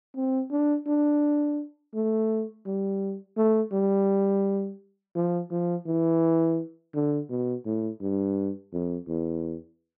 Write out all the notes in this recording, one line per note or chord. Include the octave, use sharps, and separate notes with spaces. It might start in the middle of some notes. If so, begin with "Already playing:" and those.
C4
D4
D4
A3
G3
A3
G3
F3
F3
E3
D3
B2
A2
G2
F2
E2